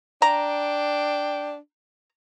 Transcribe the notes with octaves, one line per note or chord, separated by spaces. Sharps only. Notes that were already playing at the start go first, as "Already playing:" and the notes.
D4 G5 A#5